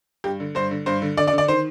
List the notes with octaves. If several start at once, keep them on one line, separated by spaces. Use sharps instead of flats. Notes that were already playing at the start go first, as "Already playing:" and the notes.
G2 G4
D3
G2 C5
D3
G2 C5
D3
D3 D5
D5
D3
D5
D#3 C5